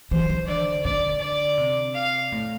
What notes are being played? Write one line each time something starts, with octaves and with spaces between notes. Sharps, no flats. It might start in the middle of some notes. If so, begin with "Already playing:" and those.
E3 C5
E3
D3 D5
D3 D5
D5
C3
F5
A2